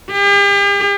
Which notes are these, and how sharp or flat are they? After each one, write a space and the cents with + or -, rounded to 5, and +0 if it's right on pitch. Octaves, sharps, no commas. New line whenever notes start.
G4 +45